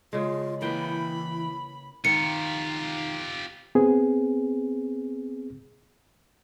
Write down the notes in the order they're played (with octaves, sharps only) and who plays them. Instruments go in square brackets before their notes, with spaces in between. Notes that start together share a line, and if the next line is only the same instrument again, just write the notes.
[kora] C#3 G#3 [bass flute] F4
[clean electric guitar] E3 G5 [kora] A#3 B4 [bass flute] E4 [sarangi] B5
[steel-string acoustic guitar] D#3 [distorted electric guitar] F4 G4 [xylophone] C#7
[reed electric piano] B3 C4 G#4